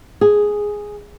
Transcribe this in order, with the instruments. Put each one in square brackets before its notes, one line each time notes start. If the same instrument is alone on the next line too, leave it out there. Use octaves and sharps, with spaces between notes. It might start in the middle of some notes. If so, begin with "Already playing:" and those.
[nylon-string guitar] G#4